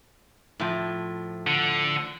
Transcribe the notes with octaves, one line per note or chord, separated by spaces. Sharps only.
A2 F3
D3